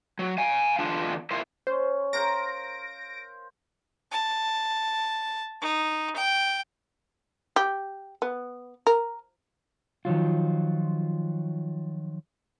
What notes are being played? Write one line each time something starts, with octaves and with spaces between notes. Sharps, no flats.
F#3
F5 G#5
E2 D3 D4 F4 F#5 A5
E4 F4 A#4 C5
C#4 C5
A#4 C5 F5 A#6 D7
A5
D#4
G5
G4
B3
A#4
D#3 F3 F#3 F4